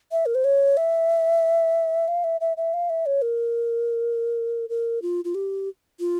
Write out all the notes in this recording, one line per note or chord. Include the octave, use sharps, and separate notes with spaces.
E5
A#4
C5
C#5
E5
F5
E5
E5
E5
F5
E5
C#5
A#4
A#4
F4
F4
G4
F4